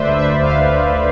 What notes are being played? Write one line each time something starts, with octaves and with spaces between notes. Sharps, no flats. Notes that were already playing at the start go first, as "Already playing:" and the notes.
Already playing: D2 D3 A3 B4 C5 D5 E5
D2 E5
D2 F5
D3